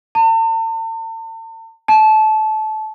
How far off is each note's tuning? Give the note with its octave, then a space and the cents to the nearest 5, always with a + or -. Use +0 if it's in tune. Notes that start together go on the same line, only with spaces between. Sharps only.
A5 +45
A5 -25